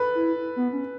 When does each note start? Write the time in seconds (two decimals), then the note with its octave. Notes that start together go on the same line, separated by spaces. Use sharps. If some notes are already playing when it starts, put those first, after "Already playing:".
Already playing: A4 B4
0.15 E4
0.56 B3
0.73 C#4